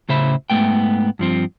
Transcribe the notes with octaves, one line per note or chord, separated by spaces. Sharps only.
A2 C#3 C5 E5 B5
G#2 G#3 A3 B3 G5
G2 F3 C4